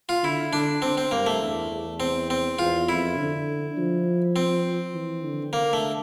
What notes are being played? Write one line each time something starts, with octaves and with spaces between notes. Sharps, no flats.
F4
D3 E4
D3 D4
C4
C4
G2 A#3
A3
E2
E2
C4
C4
E2 F4
F2 E4
D3
F3
C4
E3
D3
A#3
A3